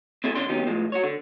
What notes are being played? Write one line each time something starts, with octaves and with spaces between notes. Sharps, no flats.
C4 E4 G#4 A4
C#3 C#4 D4 C6
D#2 F#3 B3 C#4 D#4 G4
A2 F3 G#3
F#4 C#5
D3